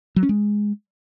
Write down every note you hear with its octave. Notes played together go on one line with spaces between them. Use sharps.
F#3
C#4
G#3